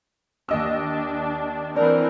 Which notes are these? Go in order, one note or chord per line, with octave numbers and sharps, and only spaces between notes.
D#2 D4 D#5 E6
E3 C4 D4 A#4